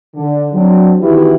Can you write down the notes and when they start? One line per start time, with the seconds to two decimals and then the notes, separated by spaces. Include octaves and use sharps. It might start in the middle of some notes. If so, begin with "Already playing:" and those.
0.15 D3
0.52 F#3 C4 D4
1.01 D#3 E3 B3 E4 F#4 G4